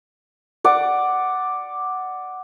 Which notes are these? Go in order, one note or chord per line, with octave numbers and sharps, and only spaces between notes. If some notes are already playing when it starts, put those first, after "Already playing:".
D5 F#5